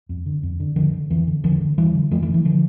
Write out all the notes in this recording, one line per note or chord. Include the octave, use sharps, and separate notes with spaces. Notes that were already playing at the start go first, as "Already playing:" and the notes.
F2
D3
F2
D3
F2 D3 F3
D3
F2 E3
D3
F2 D3 F3
D3
F2 E3 G3
D3
F2 F3 A3
E3
D3
E3
D3 F3